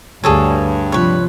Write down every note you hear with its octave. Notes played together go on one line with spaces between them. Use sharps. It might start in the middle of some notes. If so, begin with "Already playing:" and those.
D2 G2 G#4 A4 C#5
C3 F3 B4 C#5